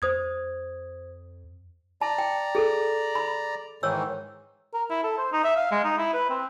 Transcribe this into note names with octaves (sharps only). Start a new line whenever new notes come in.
F2 C5 D#6 G#6
D5 A5 A#5
G5
G#4 A4
B5
G#2 D#3 E3 C#5 E6
A#4
E4
A4
C5
D#4
E5
F5
G#3
D#4
E4
B4
C4